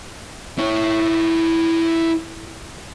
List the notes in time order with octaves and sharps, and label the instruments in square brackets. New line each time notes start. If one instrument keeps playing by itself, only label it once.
[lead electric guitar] E4 C#5